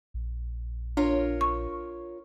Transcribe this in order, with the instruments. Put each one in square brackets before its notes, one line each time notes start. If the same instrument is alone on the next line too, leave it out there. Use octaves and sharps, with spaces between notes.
[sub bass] A#1
[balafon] D4 [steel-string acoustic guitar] F4 A#4 C#5
[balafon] C#6